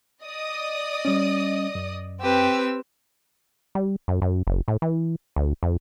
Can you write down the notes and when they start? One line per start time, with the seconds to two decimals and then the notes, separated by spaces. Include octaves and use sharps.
0.24 D5 D#5 D#6
1.05 G3 C#4
1.75 F#2
2.21 C4 G4 B4 E6
3.75 G3
4.08 F#2
4.22 F#2
4.47 F#1
4.68 A2
4.82 E3
5.36 D2
5.63 F2